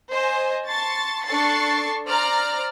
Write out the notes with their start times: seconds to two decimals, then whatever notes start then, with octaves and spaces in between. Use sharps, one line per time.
0.11 C5 D#5 G#5
0.67 A5 C6 C#6 A6
1.26 D4 A4 C#6 A6 C7
2.07 C5 D5 A#5 F6